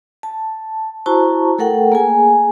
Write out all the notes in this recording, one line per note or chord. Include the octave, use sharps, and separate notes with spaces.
A5
E4 F#4 C5 A5 A#5 C#6
A3 A4 A#4 F#5 G5
A#3 G#4 G#5